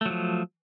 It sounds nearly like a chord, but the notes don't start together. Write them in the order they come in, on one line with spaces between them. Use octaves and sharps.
A3 F#3 F3